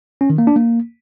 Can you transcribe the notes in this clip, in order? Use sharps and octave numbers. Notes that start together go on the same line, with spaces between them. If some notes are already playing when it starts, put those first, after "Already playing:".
C#4
D#3
A#3
D4
A#3